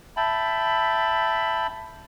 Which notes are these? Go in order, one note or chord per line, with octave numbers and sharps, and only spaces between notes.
E5 G5 A5 B5